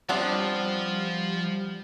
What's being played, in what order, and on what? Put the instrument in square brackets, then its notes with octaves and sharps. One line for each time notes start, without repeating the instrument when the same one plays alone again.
[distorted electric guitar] F3 [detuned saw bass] G3 [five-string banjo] B3 C4 D4